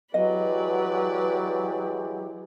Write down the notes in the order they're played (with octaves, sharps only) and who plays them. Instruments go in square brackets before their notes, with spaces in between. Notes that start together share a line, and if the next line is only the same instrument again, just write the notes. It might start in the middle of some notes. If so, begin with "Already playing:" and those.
[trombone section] E3 G#3 G4 [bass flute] F#3 [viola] B4 D5 [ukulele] D#5